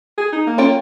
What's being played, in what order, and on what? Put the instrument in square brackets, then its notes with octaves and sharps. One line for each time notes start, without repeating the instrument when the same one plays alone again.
[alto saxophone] G#4
D#4
A#3
[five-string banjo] C#4 F4 G5